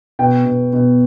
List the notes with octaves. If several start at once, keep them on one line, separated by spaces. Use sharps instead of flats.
B2 G5
B2
B2